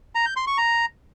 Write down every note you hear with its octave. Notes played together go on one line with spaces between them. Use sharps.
A#5
G6
C6
C#6
A#5